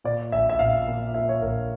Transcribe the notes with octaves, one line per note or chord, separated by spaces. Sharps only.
A#2 D5
A#1 E5
E5
A#1 F5
A#2
A#2 E5
C#5
A#1 A#4